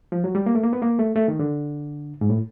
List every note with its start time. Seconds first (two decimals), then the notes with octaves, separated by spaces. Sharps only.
0.12 F3
0.24 F#3
0.35 G3
0.46 A#3
0.55 A3
0.64 A#3
0.73 B3
0.82 A#3
0.99 A3
1.16 A3
1.28 D#3
1.39 D3
2.21 G#2
2.30 A2